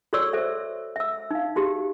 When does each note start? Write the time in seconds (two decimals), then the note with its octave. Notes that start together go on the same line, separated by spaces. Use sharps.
0.13 F#4 A4 C#5 D5 C#6 E6
0.33 A4 C5 E5
0.96 E5 E6
1.31 D#4 F5
1.56 D#4 F#4 G4